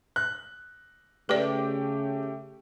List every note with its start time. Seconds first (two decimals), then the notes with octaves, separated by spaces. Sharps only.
0.16 F#6
1.29 C#3 A3 G4 B4 D5 D6